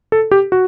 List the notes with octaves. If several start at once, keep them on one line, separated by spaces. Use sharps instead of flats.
A4
G4
F#4